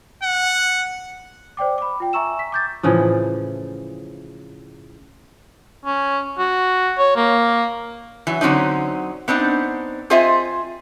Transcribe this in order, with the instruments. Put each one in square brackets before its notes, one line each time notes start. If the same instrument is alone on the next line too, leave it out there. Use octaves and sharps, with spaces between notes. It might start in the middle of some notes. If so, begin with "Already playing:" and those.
[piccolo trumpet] F#5
[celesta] C5 D5 G5 D6
B5 D6
F4 G5
E5 G#5 A#5 C#6 E6 E7
B6
D6 G6 A6
[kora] A2 C#3 E3 F3
[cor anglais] C#4
F#4
C#5
A#3
[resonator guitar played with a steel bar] E3 F#3
D3 F#3 C4 C#4 D#4
B3 C4 D4 D#4
C4 F4 G#4 C5 D#5 E5